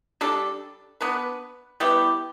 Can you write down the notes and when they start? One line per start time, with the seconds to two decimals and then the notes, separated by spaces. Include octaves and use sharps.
0.21 G3 D4 A4
1.01 B3 D4 B4
1.80 G3 B3 E4 G4